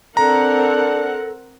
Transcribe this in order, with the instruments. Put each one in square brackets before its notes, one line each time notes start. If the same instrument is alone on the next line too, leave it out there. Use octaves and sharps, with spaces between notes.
[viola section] C4 A#4 F#5 [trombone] D4 [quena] A4 [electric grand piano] A#5